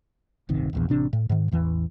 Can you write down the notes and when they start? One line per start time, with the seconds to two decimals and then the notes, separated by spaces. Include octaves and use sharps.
0.49 D1 G1 C3 D#3
0.73 E1 A#1 E2
0.89 A1 C3 D4
1.13 A2
1.29 G#2 D#3
1.51 A1 E2 E3